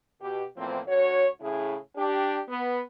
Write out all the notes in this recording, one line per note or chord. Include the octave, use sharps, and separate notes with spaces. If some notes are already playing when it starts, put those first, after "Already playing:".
B2 G4
E2 A2 F3 A#3 C4
D2 F#4 C#5
A2 C#3 E4 G#4
D4 G4
B3